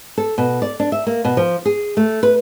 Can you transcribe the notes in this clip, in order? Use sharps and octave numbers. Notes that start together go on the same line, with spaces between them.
A4
B2
D5
D4
E5
A#3
B2
F3
G#4
A3
B4